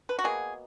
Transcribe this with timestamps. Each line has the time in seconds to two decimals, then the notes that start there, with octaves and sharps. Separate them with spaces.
0.09 B4
0.19 F#4
0.24 B2 F#3 A#3 G#4